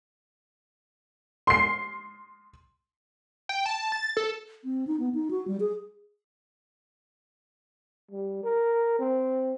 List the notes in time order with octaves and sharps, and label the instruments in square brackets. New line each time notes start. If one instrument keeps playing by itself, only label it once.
[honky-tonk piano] C6 C7
[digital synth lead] G5
A5
A6
A4
[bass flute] C4
D#4
B3
D#4
F#4
G3
G#4
[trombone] G3
A#4
C4